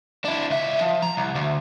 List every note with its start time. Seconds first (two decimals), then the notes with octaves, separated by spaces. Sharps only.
0.25 D4 E4
0.50 C#2 E5
0.81 F3
1.02 A#5
1.17 C2
1.35 D2